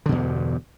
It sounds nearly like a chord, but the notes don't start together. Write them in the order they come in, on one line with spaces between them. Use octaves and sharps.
D3 B2 E2 G2